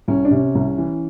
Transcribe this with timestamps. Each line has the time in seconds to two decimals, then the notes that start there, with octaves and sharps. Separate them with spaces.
0.08 C2 C#4
0.25 D4
0.31 C3 C#4
0.55 C2
0.78 E3